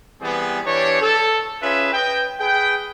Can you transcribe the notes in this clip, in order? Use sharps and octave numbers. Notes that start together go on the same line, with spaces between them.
E3 G3 B3 C4 G#4
E3 D4 G4 C#5
A4
C#4 F4 G#4 B4 E5
B4 D#5 G5
G#4 B4 G5